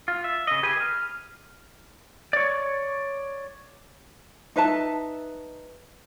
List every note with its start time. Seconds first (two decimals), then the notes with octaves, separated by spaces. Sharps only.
0.08 F4
0.24 E5
0.47 C#3 D#5
0.63 G4 G#4 B4 G#5
0.80 F6
2.33 C#5 D5
4.56 D#4 B4 E5 A5